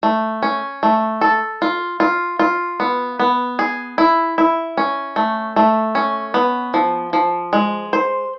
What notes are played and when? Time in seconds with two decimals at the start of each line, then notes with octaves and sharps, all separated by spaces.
0.03 A3
0.42 C#4
0.83 A3
1.21 A4
1.62 F4
2.00 F4
2.39 F4
2.80 B3
3.19 B3
3.59 G#4
3.98 E4
4.38 E4
4.77 C#4
5.16 A3
5.56 A3
5.95 C#4
6.34 B3
6.74 F3
7.13 F3
7.53 G#3
7.93 C5